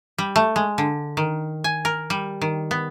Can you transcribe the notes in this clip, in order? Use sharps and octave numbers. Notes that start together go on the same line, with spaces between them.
G3
A3
G#3
D3
D#3
G#5
A#4
G3
D#3
B3